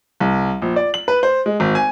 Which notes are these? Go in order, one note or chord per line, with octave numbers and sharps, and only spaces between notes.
C2
A#1
D5
F#7
B4
C5
G#3
G#1
G#5